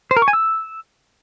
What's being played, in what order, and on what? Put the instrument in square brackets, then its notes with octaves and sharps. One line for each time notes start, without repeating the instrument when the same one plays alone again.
[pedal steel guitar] C5
A#4
C#6
G#5
E6